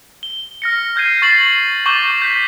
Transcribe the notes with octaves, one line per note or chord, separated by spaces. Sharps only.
G7
F6 A#6 C#7
F6 G6 G#6 C7 D#7
C#6 A6 C7 D#7 F#7
C#6 D6 G6 A6 D#7 G7
G6 B6